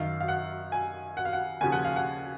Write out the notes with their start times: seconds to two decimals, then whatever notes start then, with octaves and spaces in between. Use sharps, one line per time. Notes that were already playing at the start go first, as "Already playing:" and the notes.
Already playing: F#2 D#3 F5
0.20 F5
0.28 F#5
0.72 G#5
1.17 F#5
1.25 F5
1.33 F#5
1.61 D#2 C#3 F3 G#5
1.72 F#5
1.85 F5
1.96 F#5